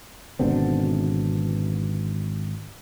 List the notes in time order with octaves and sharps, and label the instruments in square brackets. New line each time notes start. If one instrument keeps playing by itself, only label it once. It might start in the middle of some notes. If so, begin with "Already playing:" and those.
[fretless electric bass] G#1 B2 D3 C4